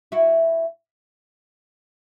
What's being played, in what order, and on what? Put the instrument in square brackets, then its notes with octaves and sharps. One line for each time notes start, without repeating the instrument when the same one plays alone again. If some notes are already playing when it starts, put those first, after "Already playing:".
[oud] E4 F#4